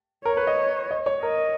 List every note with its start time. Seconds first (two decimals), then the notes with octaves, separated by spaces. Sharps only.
0.25 A#4 C#5
0.37 B4
0.47 D#5
0.91 D#5
1.06 C#5
1.23 A#4 D#5